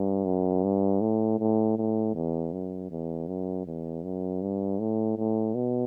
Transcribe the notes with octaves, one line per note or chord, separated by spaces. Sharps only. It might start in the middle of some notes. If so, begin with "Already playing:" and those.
Already playing: G2
F#2
G2
A2
A2
A2
E2
F#2
E2
F#2
E2
F#2
G2
A2
A2
B2